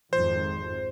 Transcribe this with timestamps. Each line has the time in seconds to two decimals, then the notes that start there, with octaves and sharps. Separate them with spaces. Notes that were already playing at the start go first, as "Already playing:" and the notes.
0.13 G#1 F2 C5